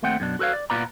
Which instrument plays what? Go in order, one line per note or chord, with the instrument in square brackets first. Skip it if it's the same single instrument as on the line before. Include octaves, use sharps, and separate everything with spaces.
[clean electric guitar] D#2 A3 C4 F#5 G5
F#2 B2 D4
F#4 A4 B4 C#5 F5
D5
A#2 B3 F4 B4 D5 A#5